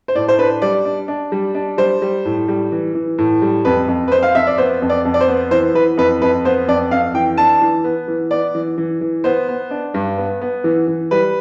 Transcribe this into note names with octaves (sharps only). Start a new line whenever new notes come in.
C5
A2 D5
C5
D4 B4
G3 D5
D4
D4
G3
D4
G3 C5
G3
A2
G3
E3
E3
A2
G3
F2 B4
F2
B4
F2 C5
F5
F2 E5
D5
B3 C5
F2
D5
F2
D5
C5
B3
E3 C5
E3 B4
F2 B4
F2 B4
B3 C5
F2 D5
F2 F5
E3 G5
D4 A5
E3
B3
E3
B3 D5
E3
E3
E3
B3 C5
B3
D4
G2
B3
B3
E3
E3
G3 B4